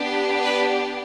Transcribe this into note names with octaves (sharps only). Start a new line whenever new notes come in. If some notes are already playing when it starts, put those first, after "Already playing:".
Already playing: B3 D4 G4
B4